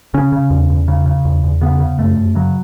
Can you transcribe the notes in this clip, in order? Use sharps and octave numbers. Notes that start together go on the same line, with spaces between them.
C#3 C#4
C#3
E2
E2
C#3
C#3
E2
E2
C#3 B3
C#3
F#2 A3
F#2
C#3 F#3